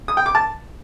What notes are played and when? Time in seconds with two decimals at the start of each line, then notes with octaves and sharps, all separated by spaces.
0.08 D#6
0.17 G5
0.26 D6
0.35 A5